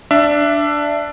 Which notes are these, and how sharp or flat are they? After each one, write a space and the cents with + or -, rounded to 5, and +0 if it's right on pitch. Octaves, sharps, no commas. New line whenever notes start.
D4 +0 E5 +20